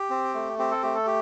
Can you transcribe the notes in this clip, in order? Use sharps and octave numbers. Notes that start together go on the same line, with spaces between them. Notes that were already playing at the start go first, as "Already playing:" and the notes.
Already playing: G4
C4
A3
C4 G4
A4
A3 G4
A4
G4